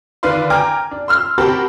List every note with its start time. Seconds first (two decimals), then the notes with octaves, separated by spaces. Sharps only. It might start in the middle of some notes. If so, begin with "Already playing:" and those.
0.23 D3 D#3 B4 D5 F5 C6
0.50 G5 G#5 A#5 D6 F6
0.91 D4
1.08 C6 E6 F6
1.38 C4 F#4 G4 A#4 A5 B5